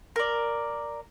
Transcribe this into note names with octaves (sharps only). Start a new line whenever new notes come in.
A#4 D5